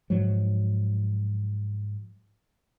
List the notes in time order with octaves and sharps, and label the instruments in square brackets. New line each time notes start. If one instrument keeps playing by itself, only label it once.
[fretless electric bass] G#2 F3 F#3